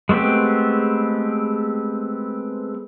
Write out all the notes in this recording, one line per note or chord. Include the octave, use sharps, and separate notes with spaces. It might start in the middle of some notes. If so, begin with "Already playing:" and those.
G#3 A3 B3 C4 G4